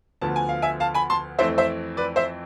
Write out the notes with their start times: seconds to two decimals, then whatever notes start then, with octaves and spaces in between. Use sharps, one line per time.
0.21 D2 D3 F3 B3 A5
0.36 G#5
0.49 F5
0.62 E5 G#5
0.80 F5 A5
0.94 G#5 B5
1.10 A5 C6
1.39 F2 E3 A3 C4 C5 E5
1.58 C5 E5
1.97 B4 D5
2.16 C5 E5